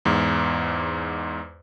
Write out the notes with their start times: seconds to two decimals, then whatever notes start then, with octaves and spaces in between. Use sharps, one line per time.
0.05 E2 G#2